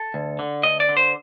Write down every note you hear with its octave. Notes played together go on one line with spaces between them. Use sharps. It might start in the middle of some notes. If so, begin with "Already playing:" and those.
Already playing: A4
D2
D3
D2 D#5
D5
D3
C5